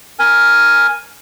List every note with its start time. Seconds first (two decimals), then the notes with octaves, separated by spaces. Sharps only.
0.19 A#4 G#5